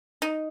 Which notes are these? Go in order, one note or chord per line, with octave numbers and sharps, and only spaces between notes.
D#4